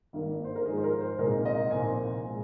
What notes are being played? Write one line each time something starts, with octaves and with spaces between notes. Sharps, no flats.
G#1 G2 D#3 A#3 D4
C5
A#4
G#2 F3 G#3 D#4 G#4
C5
A#4
C5
C2 A#2 G#3 C4 D#4 A#4
D#5
C2 A#2 F3 C4 D#4 G#5
A#2 G#3